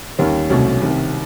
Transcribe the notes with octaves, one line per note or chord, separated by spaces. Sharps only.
D#2 D#3 G3 A#3 C#4
C2 B2 F#3 A3 C#4
C2 C3 D#3